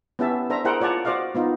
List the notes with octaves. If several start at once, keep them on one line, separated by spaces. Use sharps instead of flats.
B3 C#4 E4 G4 E5 A5
D4 A4 C5 E5 A#5
E4 G#4 A#4 C5 F#5 G5
F4 C#5 D5 F#5 A5
F#4 C5 D5 D#5 F5
B3 D#4 F4